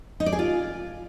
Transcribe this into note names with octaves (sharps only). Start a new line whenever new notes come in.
D#4
D5
G#4
F4